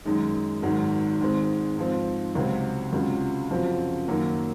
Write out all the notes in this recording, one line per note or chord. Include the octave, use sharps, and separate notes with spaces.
F#2 D#3 G#3 D#4
G#1 G#2 D#3 F#3
G#2 D#3 G#3 C4
G#2 F3 C4
C#2 C3 F#3 C4
C#2 C3 F#3 C#4 F4
F#2 C#3 F3 C4 F#4
F#2 D#3 F#3 A#3